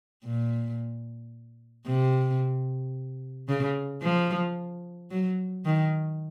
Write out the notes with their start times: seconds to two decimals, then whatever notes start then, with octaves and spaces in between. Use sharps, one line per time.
0.24 A#2
1.87 C3
3.49 C#3
4.02 F3
5.11 F#3
5.65 D#3